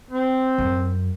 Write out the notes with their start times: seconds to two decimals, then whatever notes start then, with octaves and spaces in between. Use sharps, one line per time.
0.11 C4
0.58 F#2